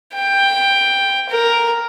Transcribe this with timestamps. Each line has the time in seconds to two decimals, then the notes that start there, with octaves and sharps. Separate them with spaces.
0.14 G5
1.29 A#4